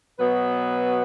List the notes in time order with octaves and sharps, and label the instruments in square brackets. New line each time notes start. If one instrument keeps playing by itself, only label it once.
[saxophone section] B2 F#3 B3 F#4 B4